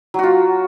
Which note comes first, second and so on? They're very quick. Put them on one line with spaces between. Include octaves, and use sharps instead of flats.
F#3 F#4 F4